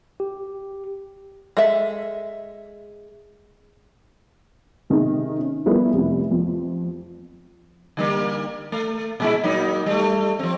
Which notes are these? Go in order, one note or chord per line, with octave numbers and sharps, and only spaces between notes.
G4
G#3 A4 E5
C3 D#3 D#4 G#4
C#4
F3 G3 B3 E4 G#4 A#4
F1 C3
F2
D3 G3 A#3
A3
A#2 G#3 E4
F#3 A#3 D#4
G3 A3
F3 C4